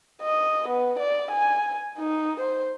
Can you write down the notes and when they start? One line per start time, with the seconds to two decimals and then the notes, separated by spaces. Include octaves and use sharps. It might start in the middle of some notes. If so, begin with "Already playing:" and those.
0.22 D#5
0.69 B3
0.99 D5
1.31 G#5
1.98 D#4
2.40 C5